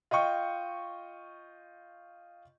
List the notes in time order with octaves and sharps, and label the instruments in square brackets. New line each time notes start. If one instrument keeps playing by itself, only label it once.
[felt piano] F4 D#5 G5 C#6